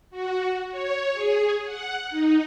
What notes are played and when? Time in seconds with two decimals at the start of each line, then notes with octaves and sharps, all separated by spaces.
0.10 F#4
0.71 C#5
1.14 G#4
1.65 F#5
2.10 D#4